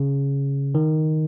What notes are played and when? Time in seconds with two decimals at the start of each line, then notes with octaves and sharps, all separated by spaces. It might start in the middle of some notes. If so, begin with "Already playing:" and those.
Already playing: C#3
0.75 D#3